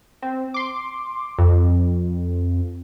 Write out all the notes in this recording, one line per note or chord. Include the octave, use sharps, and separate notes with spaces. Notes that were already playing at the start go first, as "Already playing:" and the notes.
C4
C6 D6
F2